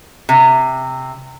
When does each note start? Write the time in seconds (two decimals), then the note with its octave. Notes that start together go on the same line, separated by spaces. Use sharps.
0.29 C3